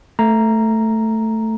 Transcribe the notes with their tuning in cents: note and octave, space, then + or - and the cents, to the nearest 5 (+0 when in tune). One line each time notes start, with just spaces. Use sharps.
A3 +5 A#5 +0